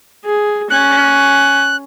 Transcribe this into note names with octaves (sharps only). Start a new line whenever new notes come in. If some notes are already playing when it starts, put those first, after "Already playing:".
G#4
C#4 F#6